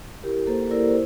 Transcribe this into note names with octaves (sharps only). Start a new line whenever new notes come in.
E4 G4 A#4
A#3 A4 C5
E4 A#4 D5
C5